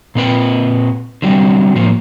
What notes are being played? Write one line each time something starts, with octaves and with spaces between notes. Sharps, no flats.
A#2 C4 B4 G5
D3 F#3 G3 C4
A2 F3 A#3